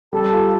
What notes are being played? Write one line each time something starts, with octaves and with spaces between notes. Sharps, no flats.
G3 A4
F4